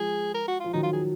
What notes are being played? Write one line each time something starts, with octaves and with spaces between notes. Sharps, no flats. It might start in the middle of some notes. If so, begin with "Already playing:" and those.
Already playing: F3 G#3 G#4
A#4
F#4
F3 F4
D#3 F#3 D#4
F4
G#4